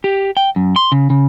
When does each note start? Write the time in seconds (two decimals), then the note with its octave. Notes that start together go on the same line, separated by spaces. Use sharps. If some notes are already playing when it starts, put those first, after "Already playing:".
0.04 G4
0.37 G5
0.56 F#2
0.76 C6
0.92 C#3
1.10 C#3